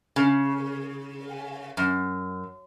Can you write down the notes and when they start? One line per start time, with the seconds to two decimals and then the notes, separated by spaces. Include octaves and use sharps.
0.16 C#3
1.77 F#2